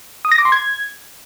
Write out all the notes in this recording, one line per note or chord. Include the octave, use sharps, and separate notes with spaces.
D#6
A#6
D6
C6
G#6